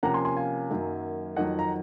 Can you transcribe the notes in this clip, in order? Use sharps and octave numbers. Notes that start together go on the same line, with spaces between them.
C3 F3 A#3 C#4 F#5 A#5
G#5 C6
G#5 C6
F5 G#5
F#2 D#3 F#3 A#3
F2 D#3 F#3 D#5 F#5
A#5